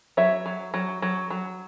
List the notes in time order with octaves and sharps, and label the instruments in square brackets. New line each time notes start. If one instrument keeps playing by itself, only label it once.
[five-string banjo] F#3 C#5 E5
F#3
F#3
F#3
F#3